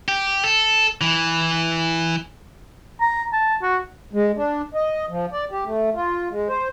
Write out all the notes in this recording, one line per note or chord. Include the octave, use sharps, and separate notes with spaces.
G4
A4
E3
A#5
A5
F#4
G#3
D4
D#5
F3
D5
G4
A3
F4
G#3
C5